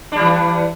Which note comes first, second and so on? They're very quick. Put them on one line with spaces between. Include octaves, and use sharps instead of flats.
D4 G3 E3